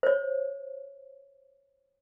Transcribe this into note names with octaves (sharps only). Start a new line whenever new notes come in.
C5 C#5